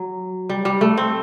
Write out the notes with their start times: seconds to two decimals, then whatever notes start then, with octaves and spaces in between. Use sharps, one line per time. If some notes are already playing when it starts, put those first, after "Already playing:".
Already playing: F#3
0.49 G3
0.65 G3
0.81 A3
0.97 C4